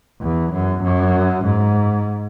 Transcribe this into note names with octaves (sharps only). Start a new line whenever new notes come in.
E2
F#2
F#2
G#2